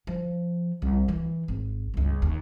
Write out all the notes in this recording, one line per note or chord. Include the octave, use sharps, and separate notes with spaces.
F3
C2
E3
G#1
G1 C#2
D#2